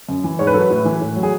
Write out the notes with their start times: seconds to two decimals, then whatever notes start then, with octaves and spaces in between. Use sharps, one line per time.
0.09 F#2
0.24 E3
0.39 G#2 C#5
0.47 B4
0.54 F#3 A4
0.61 B4
0.71 A2
0.85 E3
1.01 A2
1.16 F#3
1.23 G#4